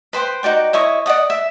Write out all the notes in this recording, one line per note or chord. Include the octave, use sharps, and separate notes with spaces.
B4 C5 G5 C6
D#4 F#4 D5 G5
E4 C#5 D#5 C#6
D5 D#5 F#5 D#6
E5